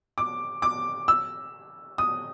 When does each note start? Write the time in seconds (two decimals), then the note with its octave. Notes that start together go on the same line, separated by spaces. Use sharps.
0.18 D6
0.62 D6
1.08 E6
1.98 D#6